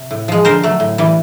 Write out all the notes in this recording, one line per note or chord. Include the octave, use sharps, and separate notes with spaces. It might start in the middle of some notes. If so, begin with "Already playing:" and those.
Already playing: C3
A2
F3 G#3
D3 A#4 C5
F#3 A3
A2
E3 G3